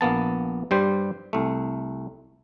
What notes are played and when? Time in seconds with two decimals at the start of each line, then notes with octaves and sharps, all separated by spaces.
0.01 A#1 A#3 B3 A5
0.71 G2 G3 C5
1.33 C2 A3